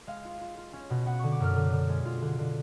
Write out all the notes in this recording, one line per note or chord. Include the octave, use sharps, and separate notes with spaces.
G#3 F5
F4
F4
F4
C#4
B2
B3 F#5
D3 C#6
D6
F#2 F6
D3
D3
G#3
F4
D3
D3